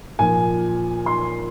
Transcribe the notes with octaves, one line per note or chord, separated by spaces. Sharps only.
A#2 F3 G#5
C6